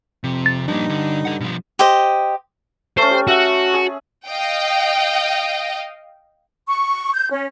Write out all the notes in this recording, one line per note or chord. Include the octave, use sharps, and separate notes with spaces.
F2 C3
A6
G2 F3 A#3 D#4
D3
A4 F#5
B2 F3
G4 C5 D#5
A3 C#4 C5
G4
F#4 E5 F#5
G#4
D#5 F5 G5
C#6
G6
C#4